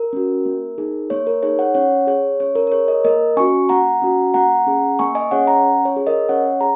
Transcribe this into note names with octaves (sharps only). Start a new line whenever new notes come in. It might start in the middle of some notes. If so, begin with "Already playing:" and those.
Already playing: A#4
C#4 F#4
A#3
D#4 G#4
A#3 C#5
A#4
D#4 G#4 C#5
C#5 F#5
C#4 C#5 F#5
G#4 C#5
C#4 C#5
A#4
A#4
G#4 C#5
A#4 D#5
A#3 A#4 D#5
C#4 F#4 G#5 C#6
A#3 F#5 A#5
C#4 F#4
A#3 F#5 A#5
C#4 G#4
A#3 G#5 C#6
D#5 G#5
C#4 G#4 C#5 F#5
F#5 A#5
C#4
C#5
G#4
A#4 D#5
C#4 C#5 F#5
G#4 A#5